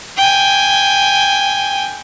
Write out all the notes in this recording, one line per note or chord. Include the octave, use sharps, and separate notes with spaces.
G5 G#5